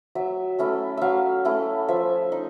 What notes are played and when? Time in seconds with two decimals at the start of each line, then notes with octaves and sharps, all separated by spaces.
0.15 F#3 E5
0.59 A3 C#4 E4
0.97 F#3 E5 F5
1.45 A3 C#4 E4
1.88 F3 E5
2.32 D#4